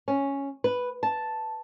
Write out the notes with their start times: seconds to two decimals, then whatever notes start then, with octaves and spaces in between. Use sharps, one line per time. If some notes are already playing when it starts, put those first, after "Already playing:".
0.08 C#4
0.64 B4
1.03 A5